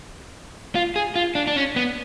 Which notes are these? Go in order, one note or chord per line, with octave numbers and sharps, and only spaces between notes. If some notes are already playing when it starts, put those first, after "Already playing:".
F4
G#4
F4
D4
D4
C#4
B3